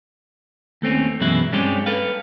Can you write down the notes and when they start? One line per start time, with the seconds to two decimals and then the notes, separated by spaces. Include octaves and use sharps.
0.82 D#2 A3 C4 C#4
1.21 F#2 B2 E3 G#3 E4 B4
1.52 G2 G3 G#3 C4 C#4 G4
1.86 A4 B4 F5